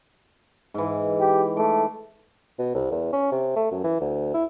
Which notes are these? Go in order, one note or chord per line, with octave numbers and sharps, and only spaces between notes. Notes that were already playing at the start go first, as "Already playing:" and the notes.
G#2 E3
G4
A3 D6
B2
C2
E2
C#4
C3
A3
F#2
E3
D2
E4